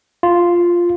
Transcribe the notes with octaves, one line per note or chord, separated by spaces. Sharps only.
F4